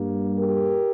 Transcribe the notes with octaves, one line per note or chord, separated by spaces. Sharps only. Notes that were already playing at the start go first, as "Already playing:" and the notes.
Already playing: G2 G3 A#3
G4 A#4